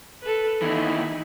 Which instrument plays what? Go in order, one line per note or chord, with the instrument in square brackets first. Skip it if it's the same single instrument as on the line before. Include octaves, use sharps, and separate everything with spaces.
[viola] A4 B4
[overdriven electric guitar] D#2 E3 [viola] D#4 E4